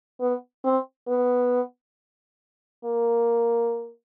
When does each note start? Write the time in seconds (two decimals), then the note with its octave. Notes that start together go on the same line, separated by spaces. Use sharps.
0.21 B3
0.64 C4
1.08 B3
2.84 A#3